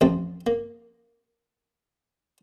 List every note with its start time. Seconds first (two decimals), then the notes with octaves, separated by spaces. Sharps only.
0.01 A1 F2 A3 C4
0.47 A#3